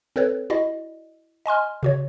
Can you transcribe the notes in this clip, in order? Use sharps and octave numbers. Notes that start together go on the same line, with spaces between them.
C4 A4 B4 C#5
E4 F#4 D5 D#5
D#5 G#5 C6 F6
C#3 F#4 C#5